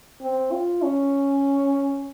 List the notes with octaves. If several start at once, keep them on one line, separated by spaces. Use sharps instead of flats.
C4
F4
C#4